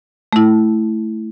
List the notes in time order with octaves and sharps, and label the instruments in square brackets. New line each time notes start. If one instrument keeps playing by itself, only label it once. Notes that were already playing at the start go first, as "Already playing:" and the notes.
[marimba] A3 E4